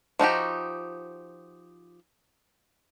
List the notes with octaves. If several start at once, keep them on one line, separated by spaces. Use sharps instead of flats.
F3 D#4 F#4 G4